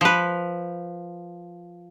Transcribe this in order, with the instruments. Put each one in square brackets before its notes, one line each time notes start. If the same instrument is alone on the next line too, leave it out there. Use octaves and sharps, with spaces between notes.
[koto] F3 B4